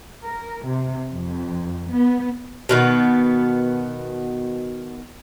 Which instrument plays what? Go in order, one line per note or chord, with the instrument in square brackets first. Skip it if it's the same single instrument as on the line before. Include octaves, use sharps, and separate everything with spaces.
[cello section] A#4
C3
F2
B3
[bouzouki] B2 D#3 B3